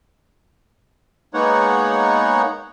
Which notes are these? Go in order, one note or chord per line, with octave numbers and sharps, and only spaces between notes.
G#3 A#3 B3 D#4 C#5 F#5